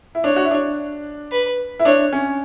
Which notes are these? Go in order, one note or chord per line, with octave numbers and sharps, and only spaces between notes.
E4
D4 C#5
F#4
E4
D4
B4
E4
D4 C#5
C#4